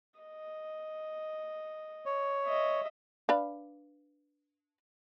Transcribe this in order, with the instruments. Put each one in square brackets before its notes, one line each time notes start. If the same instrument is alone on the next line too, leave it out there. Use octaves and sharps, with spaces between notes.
[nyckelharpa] D#5
[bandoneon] C#5
[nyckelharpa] D#5 E5
[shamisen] D4 B4 F5